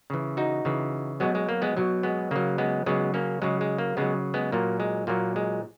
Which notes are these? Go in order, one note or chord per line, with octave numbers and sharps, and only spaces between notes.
C#3 E3
D#4 F#4
C#3 E3
B2 F#3 G#3 B3
G#3
A#3
G#3 B3
B2 F#3
G#3 B3
C#3 F#3 A#3
G#3 B3
C#3 F#3 G#3 B3
A#3 C#4
C#3 F#3 G#3
G#3
A#3
C#3 F#3 G#3 B3
G#3 B3
A#2 F#3 A#3
G#3
A#2 F#3 A#3
G#3